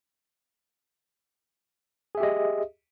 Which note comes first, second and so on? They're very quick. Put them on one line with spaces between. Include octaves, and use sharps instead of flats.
G#4 E5 G4 D#5